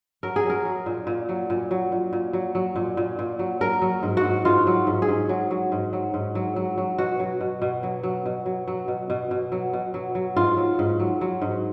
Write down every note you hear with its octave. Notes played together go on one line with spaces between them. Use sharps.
F#3 A#4
G#4
F#3
A#4
F#3
A#2
A#2
F#3
A#2
F#3
A#2
A#2
F#3
F#3
A#2
A#2
A#2
F#3
F#3 A#4
F#3
G#2
F#4
G#2
G#2 F4
F#3
G#2
G#4
G#2
F#3
F#3
G#2
F#3
G#2
F#3
F#3
F#3
B2 F#4
F#3
B2
B2
F#3
F#3
B2
F#3
F#3
B2
B2
B2
F#3
B2
F#3
F#3
G#2 F4
F#3
G#2
F#3
F#3
G#2